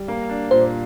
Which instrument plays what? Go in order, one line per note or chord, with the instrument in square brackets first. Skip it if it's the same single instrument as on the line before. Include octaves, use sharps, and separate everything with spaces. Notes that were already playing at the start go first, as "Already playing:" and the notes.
Already playing: [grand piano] G3
A#3
D4
[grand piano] A#2 [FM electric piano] C5